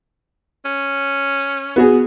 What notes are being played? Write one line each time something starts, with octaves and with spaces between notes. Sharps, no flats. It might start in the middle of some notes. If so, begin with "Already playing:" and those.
C#4
B3 F#4 G#4